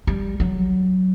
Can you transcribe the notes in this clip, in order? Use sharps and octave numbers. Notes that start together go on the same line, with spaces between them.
G3
F#3